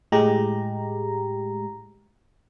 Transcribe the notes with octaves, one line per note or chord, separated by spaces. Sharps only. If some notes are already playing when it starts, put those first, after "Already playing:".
A2 G#3 G4 A#5